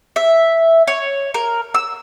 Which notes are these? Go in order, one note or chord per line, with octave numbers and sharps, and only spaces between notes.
E5
C#5
A#4
E6